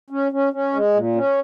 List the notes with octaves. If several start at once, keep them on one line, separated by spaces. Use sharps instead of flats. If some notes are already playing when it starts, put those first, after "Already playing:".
C#4
C#4
C#4
G#3
A#2
C#4